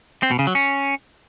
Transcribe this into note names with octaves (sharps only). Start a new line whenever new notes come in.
C4
B2
C#3
F#3
C#4